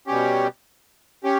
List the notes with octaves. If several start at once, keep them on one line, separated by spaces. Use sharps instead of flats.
B2 G3 C#4 G4
C#4 G4